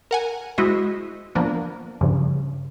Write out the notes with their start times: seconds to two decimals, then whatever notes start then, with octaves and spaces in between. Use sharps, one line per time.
0.11 A#4 F#5 G#5
0.58 G#3 E4 F#4 C5 D#5 E5
1.35 F3 A#3 B3 D4
2.01 G2 C#3 F3